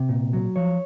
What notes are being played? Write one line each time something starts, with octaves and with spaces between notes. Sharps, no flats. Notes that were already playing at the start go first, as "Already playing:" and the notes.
Already playing: C3
A#2
F#3
F3 C#5